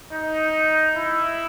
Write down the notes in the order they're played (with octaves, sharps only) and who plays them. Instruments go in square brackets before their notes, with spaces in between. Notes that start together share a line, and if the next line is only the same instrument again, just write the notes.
[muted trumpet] D#4
E4